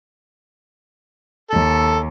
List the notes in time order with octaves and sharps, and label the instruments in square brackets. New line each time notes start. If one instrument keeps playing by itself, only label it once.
[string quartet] D#2 [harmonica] A4